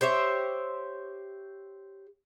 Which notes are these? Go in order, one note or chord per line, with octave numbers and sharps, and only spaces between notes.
G4 C5 C#5 E5